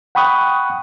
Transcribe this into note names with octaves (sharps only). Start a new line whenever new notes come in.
F#5 G5 B5 C#6 D#6 F#6